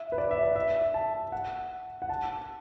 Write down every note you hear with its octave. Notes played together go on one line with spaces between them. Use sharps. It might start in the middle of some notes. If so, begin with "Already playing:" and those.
Already playing: E5
B4
D5
E5
D5
E5
A5
F#5
F#5
A5